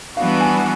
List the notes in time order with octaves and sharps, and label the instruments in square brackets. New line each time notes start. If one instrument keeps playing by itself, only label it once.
[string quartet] E3 G3 B3 D4 F#4 [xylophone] F5
[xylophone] G#5